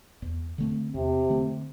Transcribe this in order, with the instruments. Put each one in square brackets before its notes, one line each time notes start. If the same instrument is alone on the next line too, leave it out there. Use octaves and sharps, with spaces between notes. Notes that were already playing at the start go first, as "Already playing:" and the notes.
[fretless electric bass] E2
D3 A3 C4
[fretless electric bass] E2 [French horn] C3
[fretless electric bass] D3 A3 C4